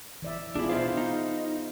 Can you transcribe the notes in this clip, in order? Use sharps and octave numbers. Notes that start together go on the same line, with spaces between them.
E3 D5 E5
B3 D4 E4 F4 G#4
B2 E4 F4 C5 F5
D#4